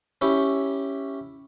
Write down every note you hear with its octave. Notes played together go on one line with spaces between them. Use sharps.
C#4 E4 G4 G5